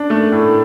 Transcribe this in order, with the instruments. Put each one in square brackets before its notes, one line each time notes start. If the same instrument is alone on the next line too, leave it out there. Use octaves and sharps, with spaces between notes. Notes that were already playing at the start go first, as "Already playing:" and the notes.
Already playing: [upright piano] D4
A3
A2